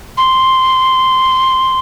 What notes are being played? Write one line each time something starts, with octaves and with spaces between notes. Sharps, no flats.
C6